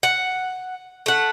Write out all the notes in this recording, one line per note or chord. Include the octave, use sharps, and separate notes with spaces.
F#5
A3 F#5